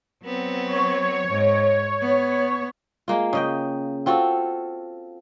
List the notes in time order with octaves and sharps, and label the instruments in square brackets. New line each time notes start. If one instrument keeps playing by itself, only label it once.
[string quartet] F#3 B3 C4
[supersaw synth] C#5
[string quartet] G#2
B3
[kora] G#3 A#3 F4
C#3 D#5 G5
C4 F4 F#4 A4